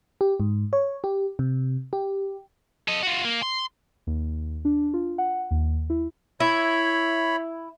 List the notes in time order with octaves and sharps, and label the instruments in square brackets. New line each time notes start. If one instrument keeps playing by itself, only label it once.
[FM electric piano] G4
G#2
C#5
G4
C3
G4
[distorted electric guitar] A4 D#5
F4 F#4
A#3
C6
[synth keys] D#2
D4
F4
F#5
D#2
E4
[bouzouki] E4 [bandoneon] C#5 B5